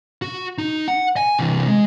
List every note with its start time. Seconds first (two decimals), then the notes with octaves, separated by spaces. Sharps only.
0.22 F#4
0.58 D#4
0.88 F#5
1.17 G#5
1.39 C3 E3
1.68 G#3